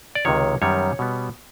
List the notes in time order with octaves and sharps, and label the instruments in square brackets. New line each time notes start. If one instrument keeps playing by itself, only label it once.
[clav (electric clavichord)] D5
C#2 C3 D#3 C#5
F#2 D#3 G3 B3 C#5
B2 G3 B3